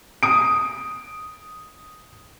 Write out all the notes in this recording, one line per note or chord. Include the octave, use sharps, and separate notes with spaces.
D#6 D7